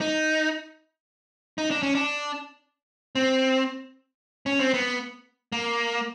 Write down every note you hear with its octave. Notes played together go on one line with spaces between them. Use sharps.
D#4
D#4
D4
C#4
D4
C4
C#4
C4
B3
A#3